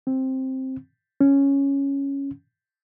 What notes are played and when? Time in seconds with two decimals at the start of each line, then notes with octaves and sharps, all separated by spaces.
0.07 C4
1.21 C#4